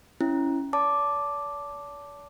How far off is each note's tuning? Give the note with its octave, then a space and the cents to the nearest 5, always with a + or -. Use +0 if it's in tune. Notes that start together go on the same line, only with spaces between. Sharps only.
C#4 +0 E4 +0
D5 -45 A5 +0 D6 +0